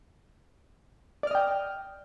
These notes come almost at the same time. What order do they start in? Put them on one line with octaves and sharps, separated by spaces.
D5 F6 D#5 G5